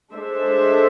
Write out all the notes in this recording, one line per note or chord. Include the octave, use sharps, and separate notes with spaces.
G#3 D4 A4 C5 E5